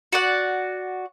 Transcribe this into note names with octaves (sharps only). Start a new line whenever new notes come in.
F#4 D5 F#5